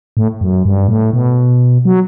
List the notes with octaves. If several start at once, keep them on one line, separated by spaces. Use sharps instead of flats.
A2
F#2
G2
A2
B2
F#3